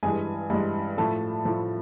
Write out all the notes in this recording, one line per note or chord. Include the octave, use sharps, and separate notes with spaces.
G2 E3 G#3 G#4 G#5
G2 E3 G#3
A2 F3 A3 A4 A5
A2 F3 A3